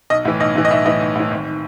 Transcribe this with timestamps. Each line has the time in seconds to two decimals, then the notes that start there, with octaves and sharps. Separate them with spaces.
0.10 B1 D#5
0.25 A2 E3
0.40 B1 D#5
0.55 A2 E3
0.65 D#5
0.71 B1 E5
0.85 A2 E3 D#5
1.01 B1
1.15 A2 E3
1.31 G#1
1.47 D#3